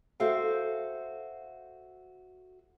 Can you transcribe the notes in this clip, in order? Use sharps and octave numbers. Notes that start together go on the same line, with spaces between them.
F#4 A4 C5 E5 F5 G5